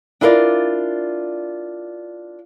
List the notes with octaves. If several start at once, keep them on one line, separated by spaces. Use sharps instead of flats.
D4 E4 F4 A#4 B4 D5